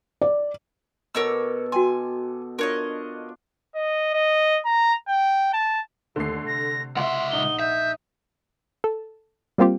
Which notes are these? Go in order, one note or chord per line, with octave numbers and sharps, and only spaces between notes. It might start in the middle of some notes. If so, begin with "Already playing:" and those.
D5
B2 A4 A#4 C#5 D6 E6
F#4 G5 G#5 C6
D4 F4 A#4 C#5 D#5
D#5
D#5
A#5
G5
A5
D#2 D3 A3 C7
C3 A#6
C#2 E5 F#5 C6
A#1 D#4 G7
E5 G6
A4
G3 A#3 C4 F4 G4